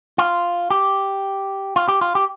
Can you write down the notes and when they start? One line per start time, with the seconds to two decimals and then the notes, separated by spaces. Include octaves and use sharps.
0.18 F4
0.70 G4
1.76 F4
1.88 G4
2.01 F4
2.15 G4